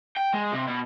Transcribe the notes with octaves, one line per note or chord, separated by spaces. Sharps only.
G5
G#3
C3
B2